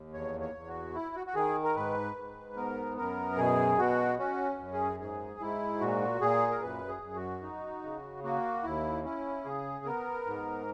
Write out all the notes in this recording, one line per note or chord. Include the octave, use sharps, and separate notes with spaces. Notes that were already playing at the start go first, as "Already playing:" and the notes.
Already playing: D#2
E2 C#5
C#5
E2
F#4
E4
F#4
F#4
D#3 G#4
A#4
G#2 B4
G#2
B3 A#4
F#2 A#4
B2 G#4
B2 F#4
C#4 F#4
F#2
G#4
G#2 G#4
G#2 E4
A#2 F#4
A#2 G#4
A#4
F#2 B4
G#4
F#2
F#4
D#4
C#3
A#3 F#4
D#2 E4
C#4 E4
C#3 G#4
B3 A#4
G#2